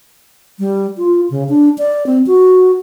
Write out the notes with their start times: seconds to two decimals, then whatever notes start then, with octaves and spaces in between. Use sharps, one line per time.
0.59 G3
0.98 F4
1.30 C#3
1.49 D4
1.78 D5
2.06 C4
2.27 F#4